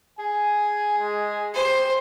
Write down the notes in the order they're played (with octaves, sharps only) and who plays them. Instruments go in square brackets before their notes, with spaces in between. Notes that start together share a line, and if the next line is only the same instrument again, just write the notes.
[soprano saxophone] G#4 [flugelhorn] G#5
[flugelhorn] G#3
[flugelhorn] G4 [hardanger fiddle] C5